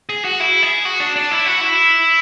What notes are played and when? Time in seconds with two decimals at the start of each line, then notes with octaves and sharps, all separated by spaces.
0.09 G#4
0.25 F#4
0.40 E4
0.63 G#4
0.85 F#4
1.00 D4
1.16 D4
1.31 E4
1.46 F#4
1.61 E4